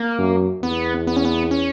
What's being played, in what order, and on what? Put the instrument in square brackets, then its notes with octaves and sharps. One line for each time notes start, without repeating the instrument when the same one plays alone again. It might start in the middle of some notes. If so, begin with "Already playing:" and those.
Already playing: [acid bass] A#3
[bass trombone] F#2
[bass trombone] E2 [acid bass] B3
[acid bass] B3
C#4
B3
C#4